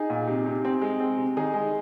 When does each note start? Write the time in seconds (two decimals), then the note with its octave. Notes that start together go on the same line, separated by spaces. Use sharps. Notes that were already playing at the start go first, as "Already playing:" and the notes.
Already playing: D#4 G#4
0.10 A#2
0.28 C3
0.46 C3
0.65 C4
0.82 G#3
1.00 C4
1.18 C3
1.37 D#3 D#4 G#4
1.54 G#3